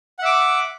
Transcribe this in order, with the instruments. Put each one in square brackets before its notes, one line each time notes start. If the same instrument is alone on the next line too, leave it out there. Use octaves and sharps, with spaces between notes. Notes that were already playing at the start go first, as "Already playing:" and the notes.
[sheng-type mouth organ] F#5
E5
D6